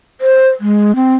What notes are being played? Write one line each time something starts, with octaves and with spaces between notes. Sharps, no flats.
C5
G#3
C4